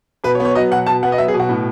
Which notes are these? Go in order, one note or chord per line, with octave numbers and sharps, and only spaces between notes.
B2 B4
C#5
B3
C#5
F#3 D#5
B2 F#5
B2 A5
B3 F#5
D#5
F#3 E5
G#4
B2
F#4
A2